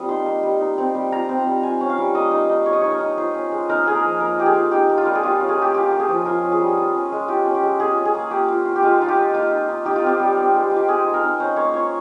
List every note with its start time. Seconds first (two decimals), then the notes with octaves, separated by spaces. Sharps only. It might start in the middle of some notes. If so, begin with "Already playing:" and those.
Already playing: G3 A#3 C4 F4 D#6
0.09 D#4 C6
0.26 A#3
0.43 G3
0.60 D#4
0.78 C4
0.95 G3
1.12 F4 A#5
1.29 C4
1.46 G3
1.63 F4 G#5
1.81 C#4
1.90 F5
1.98 G3
2.15 A#3 D#5
2.31 D#4
2.49 D#4
2.66 A#3 C#5
2.73 D#5
2.81 D#4 C#5
2.92 A#4
3.01 D#4
3.18 F4 C5
3.35 C#4
3.52 G#3
3.69 D#4 A#4
3.86 A#3 G#4
3.95 A#4
4.04 F3
4.20 A#3 A#4
4.38 F4 G4
4.46 G#4
4.55 F4
4.71 D#4 G4
4.89 A#3
4.98 F4
5.05 G3 A#4
5.15 G#4
5.23 F4 G4
5.40 C#4
5.49 G#4
5.57 A#3 G4
5.74 F4 G4
5.91 A#3
6.00 G#4
6.08 F3
6.26 F4 A#4
6.44 C#4
6.52 G#4
6.60 G3
6.77 F4
6.94 C#4
7.12 G#3
7.28 F4 G4
7.45 C#4
7.55 G4
7.63 G#3
7.80 F4 G#4
7.97 C#4
8.05 G#4
8.14 A#3
8.31 A#3 G4
8.48 F4
8.65 F4
8.76 G4
8.82 G#3 F4
9.00 D#4 F4
9.08 G4
9.17 D#4
9.34 A#3 F4
9.51 D#4
9.69 D#4
9.85 D#4 G4
9.96 F4
10.02 C4 G4
10.20 G3
10.37 C4
10.54 G#3
10.71 F4
10.77 G4
10.88 G#3 G#4
11.06 D#4
11.14 A#4
11.23 D#4
11.40 C#4 C5
11.56 A#3 C#5
11.74 F4 C#5